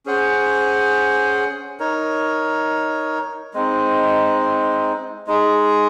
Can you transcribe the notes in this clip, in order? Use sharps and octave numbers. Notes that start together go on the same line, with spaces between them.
C#4 G#4 C5 F#5
D#4 A#4 C#5
G#3 C4 D#4
G#3 D#4 G#4